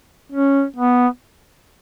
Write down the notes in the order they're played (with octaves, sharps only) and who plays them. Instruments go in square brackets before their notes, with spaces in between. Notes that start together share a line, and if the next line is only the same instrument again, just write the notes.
[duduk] C#4
B3